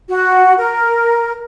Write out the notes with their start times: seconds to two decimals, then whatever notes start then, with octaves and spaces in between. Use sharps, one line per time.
0.10 F#4
0.58 A#4